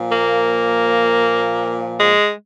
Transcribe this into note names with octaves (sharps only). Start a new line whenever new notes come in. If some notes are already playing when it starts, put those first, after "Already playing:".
Already playing: A#2 F3
A#3
G#3